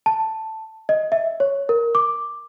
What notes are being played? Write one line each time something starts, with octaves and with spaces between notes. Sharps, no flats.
A5
D#5
E5
C#5
A#4
D6